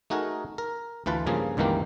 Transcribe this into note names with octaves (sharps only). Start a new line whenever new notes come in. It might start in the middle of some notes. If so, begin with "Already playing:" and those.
A3 D#4 F#4 G#4 A#4
A#4
D2 E3 F4 B4 A5
G2 C#3 F3 A#3 G#4
C#2 G2 D#3 E3 A#3 G4